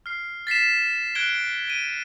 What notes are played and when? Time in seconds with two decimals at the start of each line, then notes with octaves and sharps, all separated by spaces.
0.06 F6 C7
0.47 A6 B6 C7 E7
1.15 F#6 G#6 D7 G7
1.67 D7 D#7